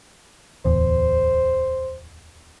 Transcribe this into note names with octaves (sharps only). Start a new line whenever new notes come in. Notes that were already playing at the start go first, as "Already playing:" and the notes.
D1 E2 C5